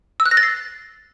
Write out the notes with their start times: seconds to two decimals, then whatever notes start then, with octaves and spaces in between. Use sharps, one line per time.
0.20 E6
0.26 F#6
0.31 A#6
0.37 A6
0.43 C7